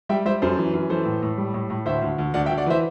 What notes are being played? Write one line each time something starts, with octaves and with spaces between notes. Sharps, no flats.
G3 E5 G5
G3 C5 E5
F#2 A4 C5
E3
F#2
E3 A4 C5
A2
A2
G3
A2
A2
D2 C5 E5
D2
D2
D2 D5 F#5
E5 G5
D2
D5 F#5
E3 C5 E5